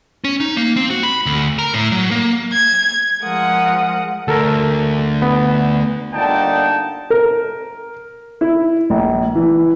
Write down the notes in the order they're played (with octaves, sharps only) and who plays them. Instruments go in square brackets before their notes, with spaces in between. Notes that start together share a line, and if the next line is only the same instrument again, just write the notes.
[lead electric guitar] C#4
D#4
A#3
C4
F#4
B5
D2
A#4
A2
F#3
A#3
[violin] G#6
[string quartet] F3 G#3 A#4 F#5 D#6
[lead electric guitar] D2 [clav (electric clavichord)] A4 A#4 A#5
[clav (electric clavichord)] B3
[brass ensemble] G1 A#2 D3 D#4 G5 A5
[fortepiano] A#4
E4
A#1
E3